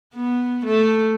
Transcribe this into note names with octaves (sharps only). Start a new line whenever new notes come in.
B3
A3